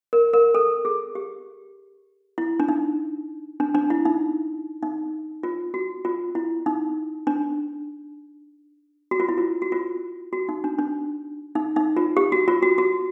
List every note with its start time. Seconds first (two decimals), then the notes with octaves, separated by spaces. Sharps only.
0.13 A#4
0.33 A#4
0.55 A4
0.85 G#4
1.15 G4
2.38 E4
2.60 D4
2.69 D#4
3.60 D4
3.75 D4
3.90 E4
4.05 D#4
4.83 D#4
5.43 F4
5.74 F#4
6.05 F4
6.35 E4
6.66 D#4
7.27 D4
9.11 F#4
9.20 F4
9.29 E4
9.38 F4
9.62 F#4
9.72 F4
10.33 F#4
10.49 D#4
10.64 D4
10.79 D4
11.55 D#4
11.76 D#4
11.97 F4
12.17 G4
12.32 F#4
12.48 F4
12.63 F#4
12.78 F#4